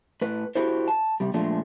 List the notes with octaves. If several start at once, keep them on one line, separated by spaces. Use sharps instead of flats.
A2 B4
E4 F#4 G4 A4 C5
A5
C3 G3
A#2 F3 G#3 A3 D4